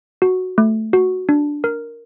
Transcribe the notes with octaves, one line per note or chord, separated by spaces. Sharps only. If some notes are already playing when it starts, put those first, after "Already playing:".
F#4
A3
F#4
D4
A#4